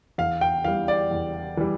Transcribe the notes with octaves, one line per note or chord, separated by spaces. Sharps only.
E2 F5
G5
E3 G3 F5
D5
E2
E3 G3